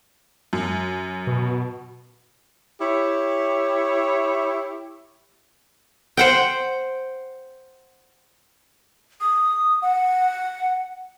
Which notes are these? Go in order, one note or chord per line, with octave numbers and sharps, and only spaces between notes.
F#2
B2
E4 G4 C#5
C5 F#5 G5
D#6
F#5